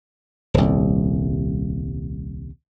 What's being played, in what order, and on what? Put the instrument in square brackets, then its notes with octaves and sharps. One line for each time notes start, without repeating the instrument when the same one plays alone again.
[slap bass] D#1 C2